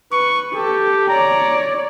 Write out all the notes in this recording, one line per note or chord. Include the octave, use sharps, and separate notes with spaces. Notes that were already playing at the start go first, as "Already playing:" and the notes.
B4 C#6
G4 A4
C#5 D5 A#5